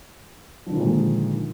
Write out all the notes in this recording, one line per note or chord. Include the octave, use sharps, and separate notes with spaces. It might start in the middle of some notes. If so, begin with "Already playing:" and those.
A#2 D3 D#3 F3 G#3